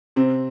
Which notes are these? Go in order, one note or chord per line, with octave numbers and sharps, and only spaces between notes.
C3 C4